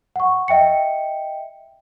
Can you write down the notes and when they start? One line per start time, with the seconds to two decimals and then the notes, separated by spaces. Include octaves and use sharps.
0.16 F#5 C#6
0.48 D#5 E5 G5 C#7